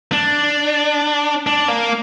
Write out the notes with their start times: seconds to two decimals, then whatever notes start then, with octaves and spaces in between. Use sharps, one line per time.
0.12 D4
1.47 D4
1.68 A#3